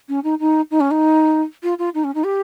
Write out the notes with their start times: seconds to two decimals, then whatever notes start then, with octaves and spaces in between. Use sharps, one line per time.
0.09 C#4
0.24 D#4
0.40 D#4
0.71 D#4
0.80 C#4
0.91 D#4
1.63 F4
1.79 F4
1.94 D#4
2.04 C#4
2.15 D#4
2.25 G4